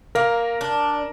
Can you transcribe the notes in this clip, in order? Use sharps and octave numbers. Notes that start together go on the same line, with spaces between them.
A#3 A#4
D4